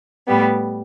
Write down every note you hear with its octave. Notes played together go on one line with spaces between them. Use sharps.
A2 G3 B3